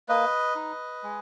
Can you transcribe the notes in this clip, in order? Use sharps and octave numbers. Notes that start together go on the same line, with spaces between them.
A#3 B4 D#5
D#4
G#3